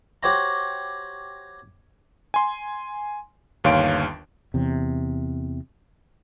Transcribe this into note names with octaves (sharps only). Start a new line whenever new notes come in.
F#4 G4 C5 C#5 G5 A#5
G#5 C6
G1 D#2 C#5 F5 C6 D7
E2 C3